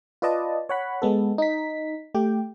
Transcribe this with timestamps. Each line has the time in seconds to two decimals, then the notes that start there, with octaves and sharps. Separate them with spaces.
0.22 F4 B4 D5 D#5 A5
0.69 C#5 F#5 B5
1.02 G#3 B3 A4
1.38 D#4 B6
2.14 A3 G4 G5